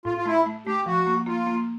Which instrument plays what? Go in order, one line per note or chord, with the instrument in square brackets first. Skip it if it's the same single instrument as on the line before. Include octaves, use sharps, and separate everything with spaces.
[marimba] A2 [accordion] F4
[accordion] F4
[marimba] A3 [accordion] E4
[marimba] A3
[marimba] A3 [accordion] G4
[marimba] F3 [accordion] F#4
[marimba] A#3
[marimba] A#3 [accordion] F4
[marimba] A#3